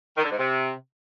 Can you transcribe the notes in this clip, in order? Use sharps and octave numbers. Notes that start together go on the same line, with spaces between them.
D#3
D3
G#2
C3